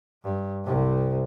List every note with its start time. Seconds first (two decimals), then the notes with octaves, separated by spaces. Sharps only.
0.24 G2
0.64 C2 C3